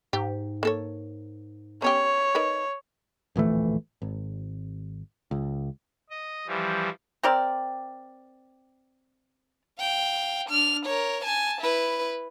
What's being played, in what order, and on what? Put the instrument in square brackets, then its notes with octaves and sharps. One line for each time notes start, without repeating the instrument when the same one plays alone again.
[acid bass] G#2 [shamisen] G4
[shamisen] A#3 A4 C#5
[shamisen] B3 C#4 G4 [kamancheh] C#5
[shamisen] D#4 A#4 B4
[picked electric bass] D1 A#1 E3 A3
G#1
C#2
[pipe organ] D#5
E3 F3 G3
[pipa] C4 G4 A#4 D5
[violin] F5 G5
D4 F6
A#4 C#5
G#5 A5
E4 B4